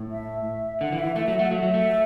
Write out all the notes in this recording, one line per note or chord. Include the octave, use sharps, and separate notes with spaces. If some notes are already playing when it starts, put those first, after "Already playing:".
Already playing: A2
E5
D3 F#5
E3
E5
E3
A3 E5
F#3 E5
A3 F#5
F#3 E5
F#3
A3